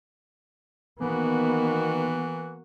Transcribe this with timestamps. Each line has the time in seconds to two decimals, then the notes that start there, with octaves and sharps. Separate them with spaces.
1.01 D#3 E3 A#3 B3 F#4